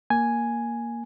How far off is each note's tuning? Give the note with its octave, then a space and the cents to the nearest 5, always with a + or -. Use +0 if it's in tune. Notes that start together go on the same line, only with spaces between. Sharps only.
A#3 +0 G#5 +0